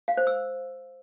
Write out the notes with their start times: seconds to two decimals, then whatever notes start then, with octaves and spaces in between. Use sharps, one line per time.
0.08 F5
0.17 C5
0.27 E6